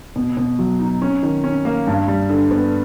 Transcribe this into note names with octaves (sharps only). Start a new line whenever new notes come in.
B2
B2
F#3
D#4
C#4
D#3
C#4
A#3
G2
G3
D3
B3